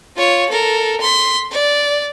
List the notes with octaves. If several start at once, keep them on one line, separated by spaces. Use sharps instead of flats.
F4 C#5
A4 A#4
C6 B6
D5